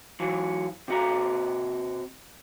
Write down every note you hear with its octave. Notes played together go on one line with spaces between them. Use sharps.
E3 F#3
C3 F#4 A#5